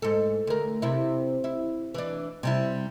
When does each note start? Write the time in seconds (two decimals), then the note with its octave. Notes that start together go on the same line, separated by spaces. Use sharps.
0.02 G#2 A4
0.47 D2 A#4
0.82 C3 E4
1.44 E4
1.94 E3 D4
2.43 C3 G3 E4